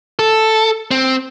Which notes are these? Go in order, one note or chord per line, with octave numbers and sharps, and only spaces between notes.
A4
C4